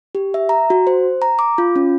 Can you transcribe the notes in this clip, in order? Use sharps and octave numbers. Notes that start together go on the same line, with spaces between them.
G4
E5
A#5
F#4
C5
A#5
D6
F4
C#4